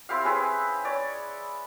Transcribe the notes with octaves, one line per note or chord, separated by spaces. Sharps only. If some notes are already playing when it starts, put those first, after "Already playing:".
C4 E4 G4 F5
C4 C#4 G#4 B4
C#5 D5